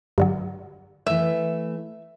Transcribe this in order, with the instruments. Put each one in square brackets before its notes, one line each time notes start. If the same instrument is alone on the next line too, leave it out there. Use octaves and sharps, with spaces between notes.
[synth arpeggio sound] G2 D3 F#3
[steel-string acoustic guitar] E3 A3 [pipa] E5